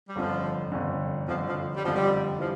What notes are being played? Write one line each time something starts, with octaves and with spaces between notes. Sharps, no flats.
G3
G1 F2 D3 F3
G1 F2 D3
G1 F2 D3 F3
F3
G3
G1 F2 D3 F3
G3
E3 F3 G3